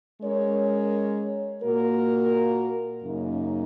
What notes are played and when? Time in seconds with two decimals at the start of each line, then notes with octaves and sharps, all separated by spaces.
0.22 G#3 C#4 A#4 C#5
1.62 A#2 A#3 F#4 A#4
3.04 F#2 C#3 A#3 D#4